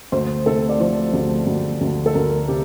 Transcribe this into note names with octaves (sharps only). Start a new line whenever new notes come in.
D2 C5
C3 A4
D5
F3 C5
D2
D2
D2
A4
D2 A#4
C3 G4